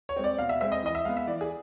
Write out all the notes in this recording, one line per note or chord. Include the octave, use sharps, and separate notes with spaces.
C#5
G#3 C4
D5
B2 F5
E5
G#3 C4 E5
D#5
E3 D#5
E5
G#3 B3 F5
E5
E3 D5
G#4